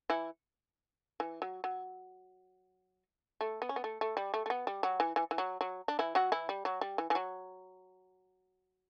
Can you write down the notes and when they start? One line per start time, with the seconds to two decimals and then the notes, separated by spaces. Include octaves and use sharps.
0.10 E3 E4
1.20 E3
1.42 F#3
1.64 F#3
3.41 A3
3.62 B3
3.69 C#4
3.76 B3
3.84 A3
4.01 A3
4.17 G3
4.34 A3
4.46 A3
4.50 B3
4.67 G3
4.83 F#3
5.00 E3
5.16 E3
5.31 E3
5.38 F#3
5.61 F#3
5.88 D4
5.99 E3 E4
6.15 F#3 F#4
6.32 E3 E4
6.49 G3
6.65 F#3
6.81 G3
6.98 E3
7.10 E3
7.15 F#3